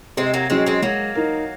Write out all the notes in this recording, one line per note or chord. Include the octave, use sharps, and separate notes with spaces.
C3 G#3 C4
F#3 A#3
F#3 G#3 C4 C#4 G#4
G#3 C4
F#3 G#3 A#3
D#4 A#4